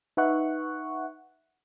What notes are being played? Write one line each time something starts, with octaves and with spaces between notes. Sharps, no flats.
D#4 B4 E5 F#5 C#6 F#6